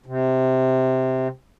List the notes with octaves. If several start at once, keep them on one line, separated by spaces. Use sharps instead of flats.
C3